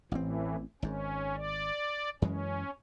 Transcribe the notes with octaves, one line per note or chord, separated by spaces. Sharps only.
A1 A2 E3 C4
G#1 G#2 C#4
D5
F#2 E3 G#3 C#4